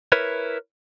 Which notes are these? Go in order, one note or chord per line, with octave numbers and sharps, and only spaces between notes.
E4 A#4 B4 C#5